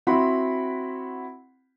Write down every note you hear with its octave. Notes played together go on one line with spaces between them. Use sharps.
C4 E4 F#4 F#5 B5 C6